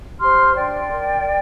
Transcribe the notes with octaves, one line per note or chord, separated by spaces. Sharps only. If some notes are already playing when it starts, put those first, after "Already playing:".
G4 C5 C6 F6
D4 D5 G5
A#4